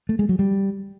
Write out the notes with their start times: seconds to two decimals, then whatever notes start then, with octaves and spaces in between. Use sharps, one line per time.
0.09 A3
0.19 G#3
0.29 F#3
0.39 G3